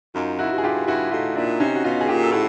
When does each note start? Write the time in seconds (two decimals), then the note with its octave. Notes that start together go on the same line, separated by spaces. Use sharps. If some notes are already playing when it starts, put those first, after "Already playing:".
0.15 F#2 D#4 F4
0.39 E4 F#4
0.51 G2
0.58 G#4
0.63 F4 G4
0.87 G2 E4 F#4
1.11 A2 D#4 F4
1.35 A#2 D4 E4
1.60 C3 C#4 D#4
1.75 F#4
1.84 B2 D#4 F4
2.01 G#4
2.08 A#2 F4 G4
2.23 A4
2.32 A2 F#4 G#4